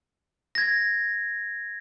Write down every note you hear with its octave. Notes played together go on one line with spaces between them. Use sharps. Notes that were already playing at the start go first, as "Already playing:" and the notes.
G#6 A#6